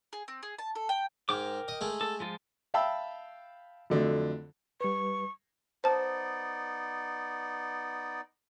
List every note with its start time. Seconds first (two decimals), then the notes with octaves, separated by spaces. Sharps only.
0.13 G#4
0.28 C4
0.43 G#4
0.59 A5
0.75 A4
0.89 G5
1.29 G#2 A#4 G5 D6
1.68 D#5
1.81 G#3 A3
2.01 A4
2.20 F3 G#3 F4
2.74 E5 F5 G5 A5 B5 E6
3.90 F2 D3 F#3 A3
4.81 G3 B4 C#6
5.84 B3 D#4 C5 D5 A5